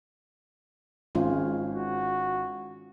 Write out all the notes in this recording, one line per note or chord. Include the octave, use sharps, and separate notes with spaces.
G#1 G#3 C#4 F4
F#4